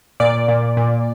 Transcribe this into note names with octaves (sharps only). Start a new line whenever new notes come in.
A#2 D5
A#2
A#2